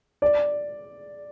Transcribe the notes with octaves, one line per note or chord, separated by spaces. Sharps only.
D5